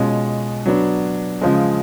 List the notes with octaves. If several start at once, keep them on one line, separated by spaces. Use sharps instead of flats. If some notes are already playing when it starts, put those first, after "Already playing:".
Already playing: B2 G#3 C#4 F4
F#3 B3 D4
C#3 F3 G#3